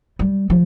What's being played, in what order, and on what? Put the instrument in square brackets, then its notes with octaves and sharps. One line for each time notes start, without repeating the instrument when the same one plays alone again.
[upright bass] G3
F3